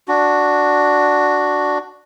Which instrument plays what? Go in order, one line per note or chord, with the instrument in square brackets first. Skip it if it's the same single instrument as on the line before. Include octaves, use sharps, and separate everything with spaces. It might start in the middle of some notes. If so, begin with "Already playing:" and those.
[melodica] D4 F#4